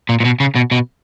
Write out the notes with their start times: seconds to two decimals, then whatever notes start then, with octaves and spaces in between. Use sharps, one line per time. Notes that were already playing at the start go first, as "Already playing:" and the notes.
0.09 A#2
0.20 A#2
0.25 B2
0.40 C#3
0.55 B2
0.71 B2